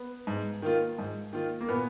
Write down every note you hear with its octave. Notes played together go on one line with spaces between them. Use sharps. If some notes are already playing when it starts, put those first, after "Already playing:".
Already playing: B3
G#2
D#3 A#3 F4
G#2
D#3 A#3 F4
A#3
A#2 B3